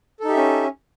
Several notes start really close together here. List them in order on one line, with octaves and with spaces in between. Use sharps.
A4 D#4 G4 E5 C#4